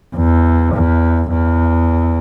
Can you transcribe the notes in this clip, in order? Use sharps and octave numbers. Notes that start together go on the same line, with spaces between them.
E2
E2
E2